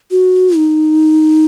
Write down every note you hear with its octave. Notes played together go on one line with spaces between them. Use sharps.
F#4
D#4